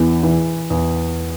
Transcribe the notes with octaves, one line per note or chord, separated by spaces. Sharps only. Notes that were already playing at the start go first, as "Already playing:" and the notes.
Already playing: E2 E3
E3
E2